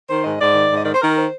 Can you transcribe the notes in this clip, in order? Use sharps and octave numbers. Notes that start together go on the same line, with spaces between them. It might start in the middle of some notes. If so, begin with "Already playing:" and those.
D#3 C5
G#2 D#5
G#2 D5
D#3
G#2
D#5
D#3 D5
C5
D#3 A#4
C5